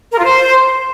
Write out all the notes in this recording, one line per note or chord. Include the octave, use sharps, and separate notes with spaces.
A#4
F4
C5